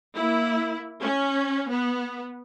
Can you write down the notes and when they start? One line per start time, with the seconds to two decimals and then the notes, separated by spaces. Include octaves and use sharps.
0.15 A#3 E4
1.01 C#4
1.70 B3